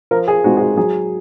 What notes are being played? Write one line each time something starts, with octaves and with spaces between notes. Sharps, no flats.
F3 A#4
G#4
G#3 C4 D#4 F#4
G#4
F#4
F#3 G#4